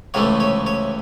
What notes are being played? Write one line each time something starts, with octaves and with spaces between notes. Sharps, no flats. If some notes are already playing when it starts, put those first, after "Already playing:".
C#2 C3 E3 A3 C#5
C#5
C#5